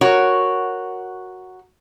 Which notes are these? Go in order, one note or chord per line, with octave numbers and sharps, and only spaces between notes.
F#4 A#4 C#5